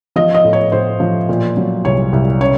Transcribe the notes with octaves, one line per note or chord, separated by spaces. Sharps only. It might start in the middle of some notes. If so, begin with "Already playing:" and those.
F3 D#5
D#5
A2
C#5
A2 C5
F3
A#2
F#3
C2 C#5
C2
C#3 C#5